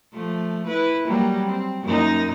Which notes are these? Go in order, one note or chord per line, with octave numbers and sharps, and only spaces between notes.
F3 A3
E4 B4
F#3 G3 A#3
C4
F#2 A#3 D#4